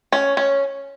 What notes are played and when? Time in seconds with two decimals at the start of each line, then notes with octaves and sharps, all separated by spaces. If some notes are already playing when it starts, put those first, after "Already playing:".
0.12 C#4
0.37 C#4